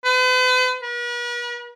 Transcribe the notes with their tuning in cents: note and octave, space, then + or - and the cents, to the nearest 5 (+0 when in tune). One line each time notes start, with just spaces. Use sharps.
B4 +45
B4 -45